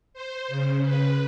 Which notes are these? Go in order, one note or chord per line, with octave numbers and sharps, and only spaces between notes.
C5
C#3
B4